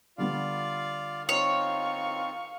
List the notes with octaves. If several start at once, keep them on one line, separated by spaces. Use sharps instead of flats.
D3 G3 B3 F4 D5 F5
C4 D#4 F4 C#5 F5 C#6